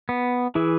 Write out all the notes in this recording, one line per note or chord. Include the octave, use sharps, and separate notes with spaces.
B3
E3 E4 G#4